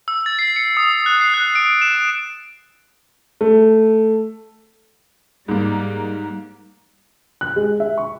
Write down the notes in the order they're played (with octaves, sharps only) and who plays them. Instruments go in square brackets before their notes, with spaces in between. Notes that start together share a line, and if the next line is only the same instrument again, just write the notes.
[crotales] E6
A6
C7
C#7
D#6
F#6
C7
F#6
D7
E7
[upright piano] A3
[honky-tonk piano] G#2 A#3 [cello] G3
[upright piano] F#6
G#3
E5
C#6